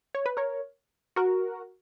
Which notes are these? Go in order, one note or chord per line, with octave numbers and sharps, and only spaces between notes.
C#5
B4
A#4 C#5
F#4 A#4